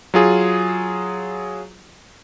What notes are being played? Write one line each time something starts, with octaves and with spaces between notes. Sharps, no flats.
F#3 F4 G#4